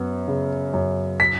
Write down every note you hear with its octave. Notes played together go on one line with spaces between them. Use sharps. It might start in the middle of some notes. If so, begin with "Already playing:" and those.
Already playing: F#2 B3
C#3
F#2
B6